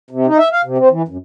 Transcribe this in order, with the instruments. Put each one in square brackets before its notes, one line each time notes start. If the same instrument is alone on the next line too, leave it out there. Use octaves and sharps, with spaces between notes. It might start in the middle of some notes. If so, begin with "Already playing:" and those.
[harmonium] C3
D#4
E5
F5
C3
C4
E3
F#2